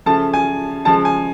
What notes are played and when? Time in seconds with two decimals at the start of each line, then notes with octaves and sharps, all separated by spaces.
0.06 C#3 F3 A3 A5
0.34 G#5
0.85 C#3 F3 G#3 A5
1.05 G#5